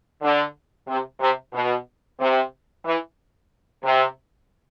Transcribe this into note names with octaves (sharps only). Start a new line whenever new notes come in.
D3
C3
C3
B2
C3
E3
C3